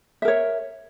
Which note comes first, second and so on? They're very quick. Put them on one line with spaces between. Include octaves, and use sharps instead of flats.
E5 A#4 C#5